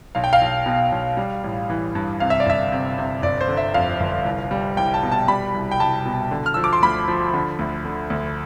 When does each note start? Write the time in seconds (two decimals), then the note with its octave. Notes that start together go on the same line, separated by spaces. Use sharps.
0.15 B1 F5
0.24 G5
0.33 F5
0.41 B1
0.66 B2
0.92 B1
1.17 G3
1.44 A1
1.70 E3
1.95 G2
2.20 C3 F5
2.30 E5
2.40 D5
2.46 G1 E5
2.72 C3
2.98 C3
3.23 G1 D5
3.41 C5
3.48 D3
3.57 E5
3.74 F2 F5
4.00 G1
4.25 C2
4.51 G3
4.77 C2 G5
4.94 A5
5.03 B2
5.12 A5
5.28 G3 B5
5.55 C2
5.71 G5
5.80 C2 A5
6.05 B2
6.31 D3
6.46 F6
6.54 F3 E6
6.64 D6
6.73 C6
6.82 D2 B5
7.08 F3
7.34 D3
7.59 D2
7.85 D3
8.10 D2